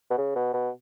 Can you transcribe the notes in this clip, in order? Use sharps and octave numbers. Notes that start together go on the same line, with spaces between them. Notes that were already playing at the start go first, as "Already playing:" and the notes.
B2
C#3
B2
B2